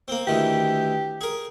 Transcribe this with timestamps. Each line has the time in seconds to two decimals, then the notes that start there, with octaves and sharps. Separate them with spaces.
0.08 A#3 C4
0.27 D2 D#3 E3 G4
1.21 G#4 A#4